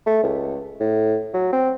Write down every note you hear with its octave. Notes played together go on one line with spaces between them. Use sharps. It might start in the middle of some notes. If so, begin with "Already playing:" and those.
A3
C#2
A2
F#3
C4